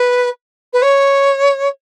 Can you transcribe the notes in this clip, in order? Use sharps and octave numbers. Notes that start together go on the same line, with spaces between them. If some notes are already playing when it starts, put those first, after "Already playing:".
Already playing: B4
B4
C#5